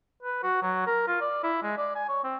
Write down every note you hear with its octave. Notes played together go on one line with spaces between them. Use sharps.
B4
F#4
F#3
A#4
F4
D5
E4
G#3
D5
G#5
C#5
C4